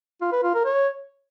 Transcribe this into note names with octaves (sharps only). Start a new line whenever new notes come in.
F4
B4
F4
A#4
C#5